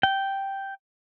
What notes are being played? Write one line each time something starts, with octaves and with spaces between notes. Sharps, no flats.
G5